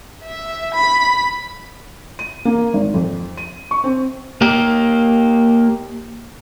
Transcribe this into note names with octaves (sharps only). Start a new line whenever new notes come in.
E5
B5
D#7
A#3
G#1
F2
D#7
C#6
C4
A#3 G4